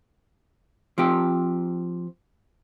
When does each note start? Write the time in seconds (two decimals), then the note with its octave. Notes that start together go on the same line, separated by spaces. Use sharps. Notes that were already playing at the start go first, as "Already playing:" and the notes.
0.98 F3 C4 G4